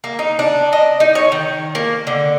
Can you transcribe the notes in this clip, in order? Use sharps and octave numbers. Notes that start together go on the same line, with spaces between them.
A#3
D#4
D4
D#5
D#4
C#5
D#3
A#3
D3